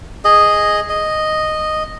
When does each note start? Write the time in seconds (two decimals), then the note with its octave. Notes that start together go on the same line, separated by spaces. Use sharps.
0.25 G#4 D#5
0.89 D#5